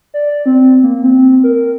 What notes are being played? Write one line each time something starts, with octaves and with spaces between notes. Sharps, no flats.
D5
C4
A#3
C4
A#4